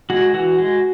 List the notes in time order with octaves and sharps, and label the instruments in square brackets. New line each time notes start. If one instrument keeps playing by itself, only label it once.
[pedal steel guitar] G#3 F#4
E3 F#4
G#3